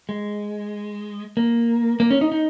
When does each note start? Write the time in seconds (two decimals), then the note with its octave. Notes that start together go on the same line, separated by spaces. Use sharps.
0.09 G#3
1.37 A#3
2.00 A#3
2.11 C#4
2.21 D#4
2.32 D#4